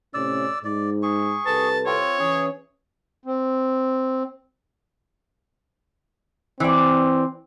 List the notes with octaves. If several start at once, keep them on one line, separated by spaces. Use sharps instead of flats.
A2 C3 C#4 D5 E6
G#2 D5
G#4 C#6
C2 A4 B4 A5
C4 F4 C#5
E3 C#4 G#4
C4
E3 C4 D5